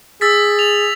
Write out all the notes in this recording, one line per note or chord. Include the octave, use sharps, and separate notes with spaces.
G#4 E6 A6 B6
F7